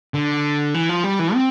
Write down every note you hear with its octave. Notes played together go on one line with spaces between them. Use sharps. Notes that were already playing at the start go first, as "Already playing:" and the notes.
D3
E3
F3
G3
E3
C4